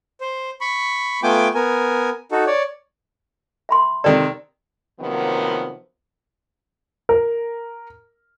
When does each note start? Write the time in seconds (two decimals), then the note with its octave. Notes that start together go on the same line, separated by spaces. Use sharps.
0.21 C5
0.61 B5 C#6
1.23 A3 B3 F4 G5 G#5 D6
1.54 B3 A#4 G#5
2.32 D#4 F#4 A4
2.46 C#5 D5
3.69 E5 B5 C6
4.04 C3 D#3 A4 D5
5.00 C3 D#3 F3 F#3 A#3 B3
7.09 A#4